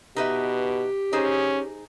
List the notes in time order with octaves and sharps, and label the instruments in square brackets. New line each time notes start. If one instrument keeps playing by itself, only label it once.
[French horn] B2 [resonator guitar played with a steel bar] D#4 B4 E5 [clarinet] G4
[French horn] C#4 [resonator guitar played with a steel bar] D#4 G#4 C5